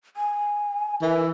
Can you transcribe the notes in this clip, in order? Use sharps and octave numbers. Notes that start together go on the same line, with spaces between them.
G#5
E3 A#4